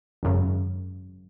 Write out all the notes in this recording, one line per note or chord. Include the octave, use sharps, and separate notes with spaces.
G#1 F#2 C#3